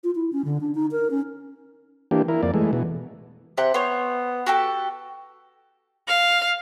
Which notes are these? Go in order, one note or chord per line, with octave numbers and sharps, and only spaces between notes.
F4
E4
C#4
D3
D4
D#4
A#4
C#4
E3 A#3 D4 G4
E4 A#4
F2 A#3 D5
E3 G#3 A3
B2 E3
C3 G4 F#5
B3 C5 C#5
F#4 G4 A4
F5